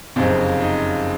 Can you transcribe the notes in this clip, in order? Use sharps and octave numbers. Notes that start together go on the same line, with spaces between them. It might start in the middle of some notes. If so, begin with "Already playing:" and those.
F#1 F2 C3 D#4
D#4